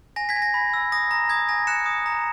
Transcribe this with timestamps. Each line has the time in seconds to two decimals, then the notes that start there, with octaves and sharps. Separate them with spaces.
0.16 G#5 A#6
0.29 G#6 B6
0.36 G#5
0.42 A#6
0.54 B5
0.74 E6
0.92 D#6 A#6
1.11 A#5 A#6
1.29 D#6 G#6
1.49 G#5 A#6
1.67 F#6 C#7 E7
1.86 D#6
2.06 A#5